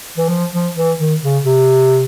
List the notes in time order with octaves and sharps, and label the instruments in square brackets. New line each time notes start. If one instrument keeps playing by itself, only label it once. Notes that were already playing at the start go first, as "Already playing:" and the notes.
[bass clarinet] E3
F3
F3
E3
D#3
C#3
C3